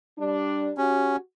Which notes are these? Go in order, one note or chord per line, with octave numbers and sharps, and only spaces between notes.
G3 D4
C#4 F#4 G4